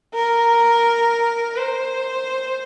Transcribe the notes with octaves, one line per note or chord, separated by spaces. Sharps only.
A#4
C5